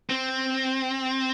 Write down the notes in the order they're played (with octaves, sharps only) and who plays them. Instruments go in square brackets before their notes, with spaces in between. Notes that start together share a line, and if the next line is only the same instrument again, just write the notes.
[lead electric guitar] C4